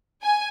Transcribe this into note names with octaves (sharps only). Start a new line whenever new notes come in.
G#5